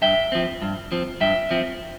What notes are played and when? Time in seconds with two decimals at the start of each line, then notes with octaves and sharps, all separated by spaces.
0.02 G2 E5 G5
0.32 F3 C4
0.62 G2
0.92 F3 C4
1.21 G2 E5 G5
1.51 F3 C4